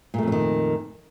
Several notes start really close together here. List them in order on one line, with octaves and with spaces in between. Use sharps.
A#2 A3 F2 F#3 D#3